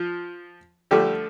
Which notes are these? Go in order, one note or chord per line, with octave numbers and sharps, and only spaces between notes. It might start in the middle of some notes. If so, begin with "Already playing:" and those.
Already playing: F3 F4
D3 F3 G3 A3 G4